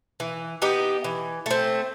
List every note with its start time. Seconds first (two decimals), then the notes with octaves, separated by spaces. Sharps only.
0.20 E3
0.62 B3 D#4 G4
1.04 E3
1.46 A3 C4